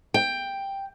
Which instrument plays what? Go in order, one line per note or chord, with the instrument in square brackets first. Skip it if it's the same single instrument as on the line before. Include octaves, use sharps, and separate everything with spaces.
[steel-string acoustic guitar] G5